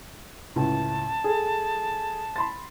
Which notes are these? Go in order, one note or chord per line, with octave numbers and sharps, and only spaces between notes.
C#2 A2 A5
G#4 A4
B5 C6 A6